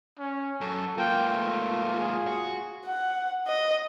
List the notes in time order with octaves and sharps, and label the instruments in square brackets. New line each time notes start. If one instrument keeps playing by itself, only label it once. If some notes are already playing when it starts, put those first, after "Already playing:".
[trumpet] C#4
[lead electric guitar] F#2 [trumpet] A4
[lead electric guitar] G#2 A#3 [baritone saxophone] F4 [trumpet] G5
[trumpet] A3
G#4
[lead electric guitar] F#4
[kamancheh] F#5
D#5